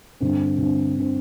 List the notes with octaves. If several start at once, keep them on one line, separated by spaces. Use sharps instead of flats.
G2 D3 C4
G2 D3 C4
D3 C4